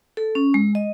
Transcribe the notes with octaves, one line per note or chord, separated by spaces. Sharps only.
A4
C#4
G#3
D#5